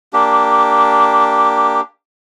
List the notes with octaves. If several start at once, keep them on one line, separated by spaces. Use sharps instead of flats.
A#3 D4 G4